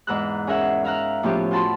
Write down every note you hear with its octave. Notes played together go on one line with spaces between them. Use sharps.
E2 G#2 B4 A#5 E6 F#6
C#4 G#4 A#4 E5 F#5
E5 F5 A#5 F6 F#6
A2 F3 B3 C#4 F4 G4
F4 F#4 A5 B5 C6